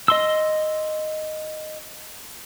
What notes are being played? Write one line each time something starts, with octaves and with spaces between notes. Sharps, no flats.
D#5 C6 E6